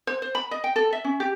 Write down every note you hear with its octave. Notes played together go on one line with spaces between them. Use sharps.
C5
C5
B5
D#5
G5
A4
E5
C#4
G4